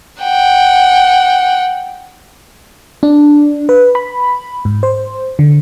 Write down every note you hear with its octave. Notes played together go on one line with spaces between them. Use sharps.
F#5 G5
D4
B4
B5
G#2
C5
D3